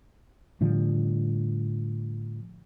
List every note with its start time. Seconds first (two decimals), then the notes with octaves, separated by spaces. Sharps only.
0.61 A2 D3 F3 G3